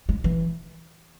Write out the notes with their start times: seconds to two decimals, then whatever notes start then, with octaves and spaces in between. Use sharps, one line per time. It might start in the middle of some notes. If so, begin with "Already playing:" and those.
0.09 G#3
0.24 E3